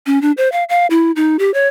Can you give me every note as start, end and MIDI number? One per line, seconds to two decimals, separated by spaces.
0.06 0.21 61
0.22 0.32 62
0.37 0.51 72
0.52 0.64 77
0.69 0.86 77
0.90 1.12 64
1.16 1.37 63
1.39 1.53 67
1.54 1.68 73